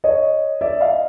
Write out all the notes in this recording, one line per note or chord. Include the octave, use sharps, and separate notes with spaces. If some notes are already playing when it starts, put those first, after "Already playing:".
C#5 D#5
D5 E5
D#5 F5